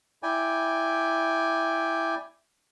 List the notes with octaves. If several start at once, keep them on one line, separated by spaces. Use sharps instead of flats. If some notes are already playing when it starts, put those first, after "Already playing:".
E4 D5 G5 G#5